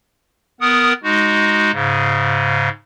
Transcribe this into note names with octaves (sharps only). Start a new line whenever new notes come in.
B3 A#4 F#5 D#6
G#3 D#4 F#4
G#2 C#3